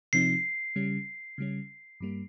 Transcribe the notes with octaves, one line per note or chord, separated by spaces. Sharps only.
C3 F3 C4 D#4 C7
C#3 G3 C#4
C#3 G3 C#4
G2 G3 A#3